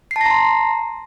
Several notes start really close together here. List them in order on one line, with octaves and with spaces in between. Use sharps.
C7 A5 A#6 A#5 C6